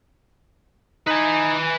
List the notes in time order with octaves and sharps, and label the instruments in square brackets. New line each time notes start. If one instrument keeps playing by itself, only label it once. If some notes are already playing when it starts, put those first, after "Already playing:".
[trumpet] D#4 [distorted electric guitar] B4 G#5